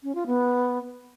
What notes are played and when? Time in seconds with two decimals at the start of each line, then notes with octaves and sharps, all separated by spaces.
0.03 C#4
0.15 F4
0.26 B3